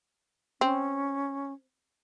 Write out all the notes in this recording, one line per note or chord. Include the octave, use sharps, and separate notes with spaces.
C4 C#4